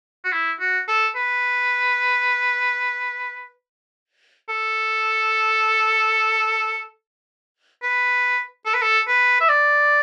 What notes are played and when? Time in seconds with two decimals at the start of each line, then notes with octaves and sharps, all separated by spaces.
0.24 F#4
0.32 E4
0.60 F#4
0.88 A4
1.16 B4
4.49 A4
7.82 B4
8.66 A4
8.74 B4
8.82 A4
9.08 B4
9.41 E5
9.49 D5